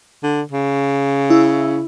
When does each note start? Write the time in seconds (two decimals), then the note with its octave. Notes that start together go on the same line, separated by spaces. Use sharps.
0.23 D3
0.52 C#3
1.30 E4